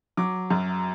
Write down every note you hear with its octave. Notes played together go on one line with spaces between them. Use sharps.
F#3 D6
F#2